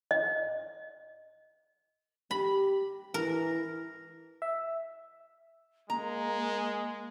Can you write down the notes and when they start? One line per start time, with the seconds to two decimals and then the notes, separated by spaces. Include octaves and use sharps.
0.11 D#5
2.31 G4 B5
3.14 E3 A#4
4.42 E5
5.90 G#3 A#3 A#5